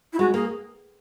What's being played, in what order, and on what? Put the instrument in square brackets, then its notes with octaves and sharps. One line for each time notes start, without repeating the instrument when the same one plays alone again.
[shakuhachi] E4
[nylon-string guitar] G#3 [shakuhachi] F#4
[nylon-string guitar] A#3 [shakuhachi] G#4